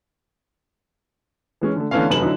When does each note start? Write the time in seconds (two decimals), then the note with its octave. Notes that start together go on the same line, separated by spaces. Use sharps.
1.61 E3 G#3 C#4
1.76 D3 A3
1.91 D3 E3 A3 B3 C#4 F5
2.10 F1 F#2 A3 B4 E7 F#7
2.22 D3 F#3 D#4 E4